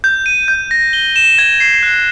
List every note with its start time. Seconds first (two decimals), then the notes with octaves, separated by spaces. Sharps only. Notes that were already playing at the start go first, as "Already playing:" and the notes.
0.04 G6
0.26 D#7
0.48 G6
0.71 A#6
0.93 G7
1.16 E7
1.38 G#6
1.60 C7
1.83 F#6